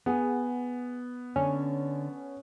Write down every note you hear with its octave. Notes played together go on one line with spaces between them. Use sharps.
B3 G#4 F#5 G#5
D3 C#4